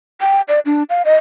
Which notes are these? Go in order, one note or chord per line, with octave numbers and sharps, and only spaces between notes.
G5
D5
D4
F5
D#5